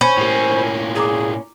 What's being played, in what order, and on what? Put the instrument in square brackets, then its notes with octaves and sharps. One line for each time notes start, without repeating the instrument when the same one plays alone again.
[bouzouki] C#4 [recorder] C5 [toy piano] B5
[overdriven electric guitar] A2 A#3 [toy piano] G4 G5
[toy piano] D4 F4
[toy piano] E4 A#5 D6 [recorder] G#4